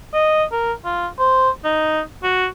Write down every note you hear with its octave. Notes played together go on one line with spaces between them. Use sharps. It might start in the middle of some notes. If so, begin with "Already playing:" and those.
D#5
A#4
F4
C5
D#4
F#4